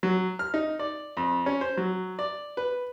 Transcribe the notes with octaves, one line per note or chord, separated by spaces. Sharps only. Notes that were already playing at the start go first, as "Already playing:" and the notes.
F#3
F6
D#4
D5
F2
C#4
C5
F#3
D5
B4